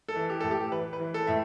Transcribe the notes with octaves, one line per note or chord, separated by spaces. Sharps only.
A4
E3
G4
A2 A4
G4
E3 B4
B4
E3
A4
A2 E5